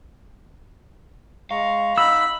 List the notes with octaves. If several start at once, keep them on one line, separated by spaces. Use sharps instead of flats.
G#3 F5 A#5 C#6
D#4 D#5 F#5 B5 E6